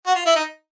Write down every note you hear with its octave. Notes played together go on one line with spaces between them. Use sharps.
F#4
F4
E4
D#4